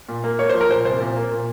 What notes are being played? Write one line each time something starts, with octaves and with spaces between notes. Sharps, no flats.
A#2
A#3
A#3 C#5
F3 C5
A#4
A#2 C5
C2 C5
A#2
A#3
A#2